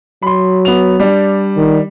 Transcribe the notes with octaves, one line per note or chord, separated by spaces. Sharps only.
F#3 B5 C6
B3 F7
G3 D4
D#3